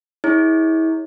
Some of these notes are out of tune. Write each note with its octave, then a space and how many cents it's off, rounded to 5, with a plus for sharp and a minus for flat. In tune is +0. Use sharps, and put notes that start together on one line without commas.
E4 -35 G#4 +0 C#5 +0